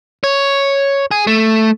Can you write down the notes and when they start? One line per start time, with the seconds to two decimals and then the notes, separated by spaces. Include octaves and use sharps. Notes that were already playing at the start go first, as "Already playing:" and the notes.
0.24 C#5
1.11 G#4
1.27 A3